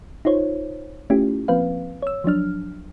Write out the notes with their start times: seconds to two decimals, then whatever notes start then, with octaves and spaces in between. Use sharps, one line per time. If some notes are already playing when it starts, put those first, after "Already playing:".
0.25 D#4 F4 C5 C#5
1.10 A3 C#4 E4 F4 G4
1.48 F3 A#3 C4 B4 F5
2.02 C#5 E6
2.24 F3 F#3 D4 F6